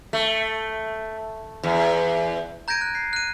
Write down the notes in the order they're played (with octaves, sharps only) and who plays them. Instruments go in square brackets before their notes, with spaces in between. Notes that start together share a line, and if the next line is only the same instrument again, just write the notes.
[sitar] A3
E2
[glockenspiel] A#5 G6 G#6 A#6 D7 D#7
F#6
C7
F#6 D#7